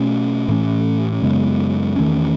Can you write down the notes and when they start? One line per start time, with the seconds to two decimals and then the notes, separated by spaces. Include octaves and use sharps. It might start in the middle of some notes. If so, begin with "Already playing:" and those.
Already playing: B2 A3 C#4
0.48 A2 E3 A3 C#4
1.22 F#2 C#3 G#3 B3
1.96 E2 D#3 A3 C#4